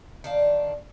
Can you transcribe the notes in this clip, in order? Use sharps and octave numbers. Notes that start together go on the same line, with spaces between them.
D#3 D4 F5